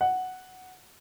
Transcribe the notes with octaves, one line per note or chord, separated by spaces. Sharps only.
F#5